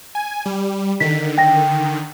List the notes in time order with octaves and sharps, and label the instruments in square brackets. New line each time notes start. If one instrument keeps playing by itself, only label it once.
[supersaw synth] G#5
G3
[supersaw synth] D3 D#3 [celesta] B6
[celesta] G5 A#6